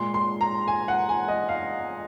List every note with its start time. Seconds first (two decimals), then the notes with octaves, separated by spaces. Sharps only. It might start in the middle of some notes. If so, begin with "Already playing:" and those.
Already playing: A#2 G#3 C6
0.14 C6
0.41 A#5
0.68 G#5
0.88 F#5
1.09 G#5
1.28 D#5
1.49 F5